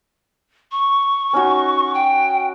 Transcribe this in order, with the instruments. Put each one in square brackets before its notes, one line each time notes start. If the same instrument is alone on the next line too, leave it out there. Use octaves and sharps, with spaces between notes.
[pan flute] C#6
[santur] C#4 D#4 F#4
[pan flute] G5